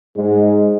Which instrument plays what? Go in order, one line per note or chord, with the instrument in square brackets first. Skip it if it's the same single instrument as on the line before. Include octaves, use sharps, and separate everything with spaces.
[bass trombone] G#2 [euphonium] G#3